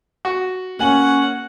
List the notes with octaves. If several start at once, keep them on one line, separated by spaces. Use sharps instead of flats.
F#4
A#3 C#4 F#5 G#5 F#7